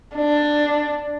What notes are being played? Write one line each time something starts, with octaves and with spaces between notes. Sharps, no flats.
D4